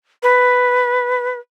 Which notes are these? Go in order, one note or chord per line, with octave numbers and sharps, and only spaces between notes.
B4